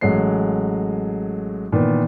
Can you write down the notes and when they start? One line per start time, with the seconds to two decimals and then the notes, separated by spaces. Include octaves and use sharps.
0.01 A1 F#3 G#3 A3 C7
1.72 A#2 D#3 E3 B3